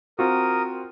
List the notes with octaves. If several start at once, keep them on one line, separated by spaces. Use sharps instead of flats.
C4 F4 F#4 A#4 D#6